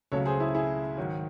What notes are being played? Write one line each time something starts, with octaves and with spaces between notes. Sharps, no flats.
C#2 C#3 F#3 A3 A4 C#5
G#4 C5
E4 G#4
E4 G#4
G#2 D#3 F#3